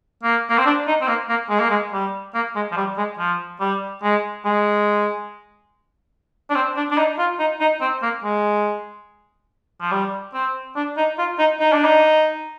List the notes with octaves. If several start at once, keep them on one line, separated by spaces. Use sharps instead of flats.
A#3
A#3
C4
D4
D#4
C4
A#3
A#3
G#3
A#3
G#3
G3
A#3
G#3
F3
G3
G#3
F3
G3
G#3
G#3
D4
C4
D4
D4
D#4
F4
D#4
D#4
C4
A#3
G#3
F3
G3
C4
D4
D#4
F4
D#4
D#4
D4
D#4